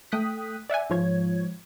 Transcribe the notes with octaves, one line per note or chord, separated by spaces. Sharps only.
A3 G5 D#6 F#6 B6
D5 E5 F#5 G#5
G#2 F3 C#5 G#6